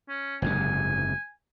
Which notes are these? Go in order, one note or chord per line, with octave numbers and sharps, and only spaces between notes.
C#4
F#1 G#2 C3 G#5